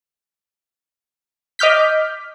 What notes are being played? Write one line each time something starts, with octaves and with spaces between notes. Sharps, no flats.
D#5 D6 F6 G6 B6